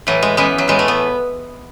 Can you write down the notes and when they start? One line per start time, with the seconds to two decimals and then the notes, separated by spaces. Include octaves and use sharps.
0.07 A2 E3 F#3
0.22 G#3
0.37 F#2 E3 G#3 B3
0.58 F#3
0.68 A2 E3 G#3
0.79 A3
0.88 B3